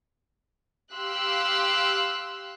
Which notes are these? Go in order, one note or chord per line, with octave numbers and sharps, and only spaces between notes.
G4 F5 C6 E6 F#6